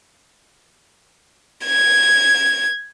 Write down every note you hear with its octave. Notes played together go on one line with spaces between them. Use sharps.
G#6